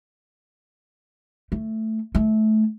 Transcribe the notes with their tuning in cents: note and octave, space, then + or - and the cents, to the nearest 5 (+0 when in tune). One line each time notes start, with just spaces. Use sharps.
A3 +0
A3 -20